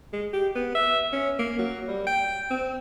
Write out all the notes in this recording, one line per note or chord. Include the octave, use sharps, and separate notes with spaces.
G#3
G4
B3
E5
C#4
A#3
F#3
G3
G5
C4